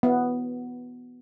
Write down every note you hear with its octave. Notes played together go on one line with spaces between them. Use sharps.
B3